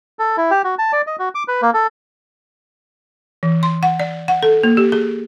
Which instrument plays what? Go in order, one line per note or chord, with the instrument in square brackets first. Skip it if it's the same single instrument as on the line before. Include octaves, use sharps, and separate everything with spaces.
[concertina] A4
E4
G4
F#4
A5
D5
D#5
F#4
D6
B4
A#3
A4
[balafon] E3
C6
F#5
D5
F#5
A4
A#3
G4
G#4